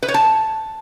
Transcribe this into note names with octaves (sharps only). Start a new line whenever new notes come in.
B4
C#5
A5